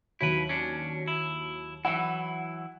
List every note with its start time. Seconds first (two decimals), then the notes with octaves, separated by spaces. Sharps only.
0.21 D#2 F#3 E4 B4
0.49 C#4 D4
1.08 E4
1.85 E3 F#3 E4 F#5